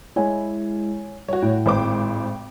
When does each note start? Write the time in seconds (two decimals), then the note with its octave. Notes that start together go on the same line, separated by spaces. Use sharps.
0.16 G#3 E4 C#5 G#5
1.28 G3 F#4 C#5
1.42 A2 G5
1.66 G#1 C5 D6